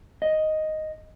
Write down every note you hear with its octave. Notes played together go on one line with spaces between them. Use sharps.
D#5